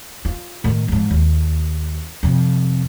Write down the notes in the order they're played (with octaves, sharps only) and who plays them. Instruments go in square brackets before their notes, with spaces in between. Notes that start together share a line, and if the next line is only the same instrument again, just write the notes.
[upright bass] F4
A2 D#3
F2 G#2
D#2
F2 C3